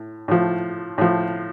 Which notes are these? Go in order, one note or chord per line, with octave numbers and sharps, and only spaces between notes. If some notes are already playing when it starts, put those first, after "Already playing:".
Already playing: A2
A2 F3
A2 F3